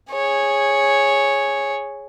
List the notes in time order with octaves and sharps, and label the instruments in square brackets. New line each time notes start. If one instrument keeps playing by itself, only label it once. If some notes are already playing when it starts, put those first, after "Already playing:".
[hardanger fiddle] G#4 C#5